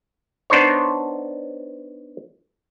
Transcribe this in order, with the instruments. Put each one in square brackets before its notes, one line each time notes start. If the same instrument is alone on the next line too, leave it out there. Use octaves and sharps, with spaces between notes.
[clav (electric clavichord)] B3 D4 D#4 C5 C#5